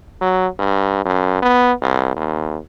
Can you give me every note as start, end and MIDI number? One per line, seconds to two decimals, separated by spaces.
0.21 0.47 54
0.59 1.05 43
1.05 1.39 42
1.42 1.72 59
1.81 2.14 36
2.16 2.57 39